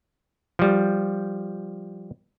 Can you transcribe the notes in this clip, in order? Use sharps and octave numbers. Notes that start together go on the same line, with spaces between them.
F3 G3